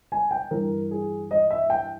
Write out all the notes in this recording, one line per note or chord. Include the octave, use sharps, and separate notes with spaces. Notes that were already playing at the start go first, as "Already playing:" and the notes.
G#5
G5
G2 E3 A#4
G#4
D#5
E5
G5